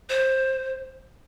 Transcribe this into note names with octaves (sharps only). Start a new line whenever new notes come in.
C5